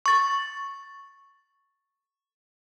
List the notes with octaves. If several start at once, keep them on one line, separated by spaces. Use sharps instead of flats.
C#6 A6